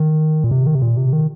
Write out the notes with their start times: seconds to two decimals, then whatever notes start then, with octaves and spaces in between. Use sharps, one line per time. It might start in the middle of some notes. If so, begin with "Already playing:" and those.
Already playing: D#3
0.44 A#2
0.51 C3
0.67 D#3
0.75 C3
0.82 A#2
0.97 C3
1.13 D#3